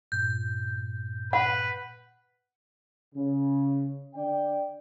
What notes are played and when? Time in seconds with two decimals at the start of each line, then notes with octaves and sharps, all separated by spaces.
0.12 G2 A#2 G6
1.33 B4 F#5
3.14 C#3
4.15 D3 D5 G5